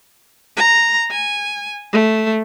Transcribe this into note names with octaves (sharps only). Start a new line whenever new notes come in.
A#5
G#5
A3